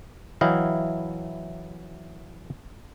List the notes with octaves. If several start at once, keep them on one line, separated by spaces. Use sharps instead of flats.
E3 F#3 E4 D#5 F5 G5